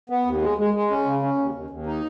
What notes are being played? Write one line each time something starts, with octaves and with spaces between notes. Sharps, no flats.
B3
D#2
G#3
G#3
G#3
C#4
C#3
C#4
D#2
D#2
D#2
D#4